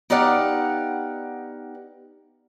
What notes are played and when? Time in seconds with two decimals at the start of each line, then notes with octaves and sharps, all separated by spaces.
0.10 B3 D#4 G4 D5 F5 F#5